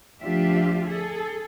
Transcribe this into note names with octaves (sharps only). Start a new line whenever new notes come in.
D2 F3 D4 F4 G4 E5
G#4 A4